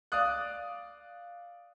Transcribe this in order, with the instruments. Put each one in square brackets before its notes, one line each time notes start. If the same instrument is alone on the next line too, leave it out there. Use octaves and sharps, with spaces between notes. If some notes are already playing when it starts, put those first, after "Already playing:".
[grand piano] D5 F5 D#6 F#6